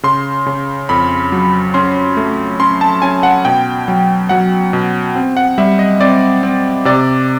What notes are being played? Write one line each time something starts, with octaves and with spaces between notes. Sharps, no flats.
C#3 C6
C#3
F2 B5
F#3
C#4 C6
A3
C#4 C6
A5
C#4 G#5
F#5
B2 G5
F#3
F#3 F#5
B2
C4
F#5
G3 E5
D#5
C4 D5
C4
C3 D5